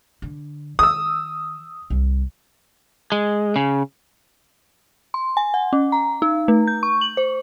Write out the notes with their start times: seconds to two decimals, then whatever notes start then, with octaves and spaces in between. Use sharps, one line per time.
0.22 D3
0.79 D#3 D#6 E6
1.90 C2
3.12 G#3
3.56 C#3
5.14 C6
5.37 G#5
5.54 F#5
5.73 C#4
5.92 A#5
6.22 D#4
6.48 A3
6.67 G6
6.83 C#6
7.01 F#7
7.17 C5